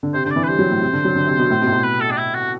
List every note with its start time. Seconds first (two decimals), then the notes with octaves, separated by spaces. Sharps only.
0.03 D3
0.14 C3 C5
0.25 D3 C5
0.31 D5
0.36 E3
0.44 B4
0.48 G3 C5
0.59 F#3
0.71 A2
0.81 C3
0.93 D3
1.05 F#3
1.15 D3
1.27 C3
1.39 B2
1.50 A2
1.62 B2
1.67 A2
1.72 B2
1.84 B4
2.01 A4
2.11 D4
2.18 E4
2.34 F#4